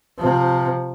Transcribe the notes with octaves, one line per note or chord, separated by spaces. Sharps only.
C3 F3